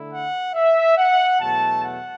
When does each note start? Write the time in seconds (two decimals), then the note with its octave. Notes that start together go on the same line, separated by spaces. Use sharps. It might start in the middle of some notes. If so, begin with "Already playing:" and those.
Already playing: D3 A3 E4
0.11 F#5
0.54 E5
0.97 F#5
1.40 E2 B2 F#3 A3 E4 A5
1.83 F#5